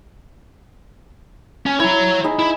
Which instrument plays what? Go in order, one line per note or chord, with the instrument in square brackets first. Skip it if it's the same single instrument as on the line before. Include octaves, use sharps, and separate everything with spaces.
[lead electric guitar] C#4
[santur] E4 [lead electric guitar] C#5 A#5
[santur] D#4 G#4 B5
[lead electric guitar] E4